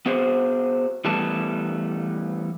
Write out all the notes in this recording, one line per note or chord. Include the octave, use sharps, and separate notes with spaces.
B3 F#4 G#4 C5
E3 G3 A3 B3 A5